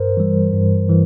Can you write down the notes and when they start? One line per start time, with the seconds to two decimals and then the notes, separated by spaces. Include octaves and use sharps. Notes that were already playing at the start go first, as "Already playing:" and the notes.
Already playing: G2 A#4 C5
0.17 E3 G3
0.53 G2
0.89 E3